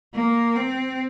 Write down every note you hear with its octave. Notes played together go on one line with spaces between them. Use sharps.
A#3
C4